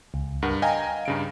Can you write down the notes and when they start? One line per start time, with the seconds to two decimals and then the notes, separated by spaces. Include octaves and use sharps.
0.14 C#2
0.42 G2 A#4 F#5
0.62 D#5 F5 G5 G#5 A#5
1.05 G2 C#3 D7